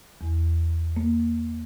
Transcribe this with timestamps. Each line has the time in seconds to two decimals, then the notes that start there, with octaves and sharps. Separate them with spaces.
0.21 E2
0.96 A#3